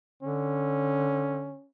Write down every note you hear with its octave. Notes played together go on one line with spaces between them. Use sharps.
D3 C#4